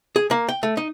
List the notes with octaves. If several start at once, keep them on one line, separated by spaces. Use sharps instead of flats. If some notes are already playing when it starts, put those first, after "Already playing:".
G#4
A#3
G5
A3
D#4